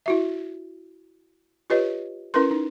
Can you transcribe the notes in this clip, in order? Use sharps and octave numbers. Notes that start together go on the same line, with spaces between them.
E4 F#4 E5
F4 G4 B4 C#5 D#5
C#4 E4 A#4 B4 C6
D#4